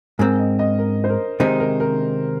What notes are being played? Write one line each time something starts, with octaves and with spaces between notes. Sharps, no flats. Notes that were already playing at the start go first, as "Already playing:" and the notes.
G#2 G#3 C4 A#4
D#5
D#5
A#4
C5
A#4
C3 D#3 G#3 D#4 C5
A#4
A#4